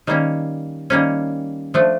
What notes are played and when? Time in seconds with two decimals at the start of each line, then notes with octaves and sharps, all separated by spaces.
0.07 D#3 G3 A#3 C#4
0.90 D#3 G3 A#3 C#4
1.74 F3 A3 D4